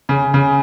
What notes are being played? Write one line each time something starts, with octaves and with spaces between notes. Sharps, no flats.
C#3
C#3